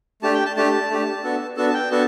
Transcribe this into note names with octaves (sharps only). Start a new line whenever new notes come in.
A3 D4 G4 A5
G5
A5
A3 D4 G4 A5
A3 D4 G4
B3 D4 F#4 A4
B3 D4 F#4 A4 A5
A5
G5
B3 D4 F#4 A4 A5